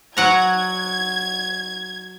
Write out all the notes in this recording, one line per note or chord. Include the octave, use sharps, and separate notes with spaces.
F#3 F#5 A#5 G#6